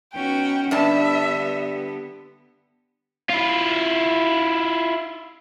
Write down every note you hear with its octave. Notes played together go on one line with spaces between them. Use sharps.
F#3 B3 C#4 D#4 F#4 G5
G2 D3 B3 D4 G4 E5 A5
E4 F4